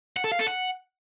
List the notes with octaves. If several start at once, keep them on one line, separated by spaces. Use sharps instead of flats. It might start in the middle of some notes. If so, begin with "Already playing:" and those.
F#5
A4
F5
A4
F#5